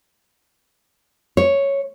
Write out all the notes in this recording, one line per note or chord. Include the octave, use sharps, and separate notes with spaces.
C#5